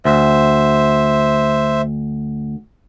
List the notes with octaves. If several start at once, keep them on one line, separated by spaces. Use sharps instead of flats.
D2 C5 E5